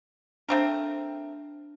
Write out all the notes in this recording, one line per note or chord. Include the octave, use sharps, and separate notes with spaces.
A3 C4 D4 A#4